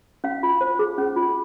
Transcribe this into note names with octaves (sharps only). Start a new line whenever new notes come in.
C#4 F5
F4
C5
G#4
C#4
F4